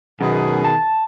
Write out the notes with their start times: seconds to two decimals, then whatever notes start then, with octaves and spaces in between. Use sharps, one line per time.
0.21 F#2 B2 D#3 G#4
0.65 A5